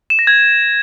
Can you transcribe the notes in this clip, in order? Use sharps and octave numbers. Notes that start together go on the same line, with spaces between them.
E7
A#6
G#6